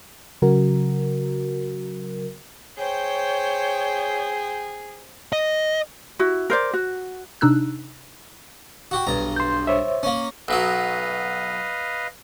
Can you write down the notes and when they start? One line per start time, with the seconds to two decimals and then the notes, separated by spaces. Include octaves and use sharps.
0.42 C#3 F#3 F#4 A#4
2.78 G#4 C5 C#5 G5
5.33 D#5
6.19 E4 F#4
6.50 A#4 C5 D5
6.73 F#4
7.41 C3 D4 D#4 E6 F#6
8.91 F#4 G4
9.07 B1 G2 A#5
9.36 C6 G6
9.67 C5 C#5 E5
10.03 A#3 C#4
10.48 B1 B2 F#3 B4 D#5 F5